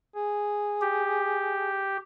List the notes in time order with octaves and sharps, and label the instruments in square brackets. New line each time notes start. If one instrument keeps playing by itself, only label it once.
[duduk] G#4
[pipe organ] G4